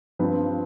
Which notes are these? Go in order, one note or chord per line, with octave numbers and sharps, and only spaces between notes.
G2 F3 C4 B4